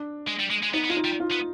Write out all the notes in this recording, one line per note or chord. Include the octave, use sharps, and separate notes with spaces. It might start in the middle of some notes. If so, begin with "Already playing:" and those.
Already playing: D4
G#3
G3
G#3
G#3
B3 D#4
B3
G#3 F4
D#4
G3
F4
B3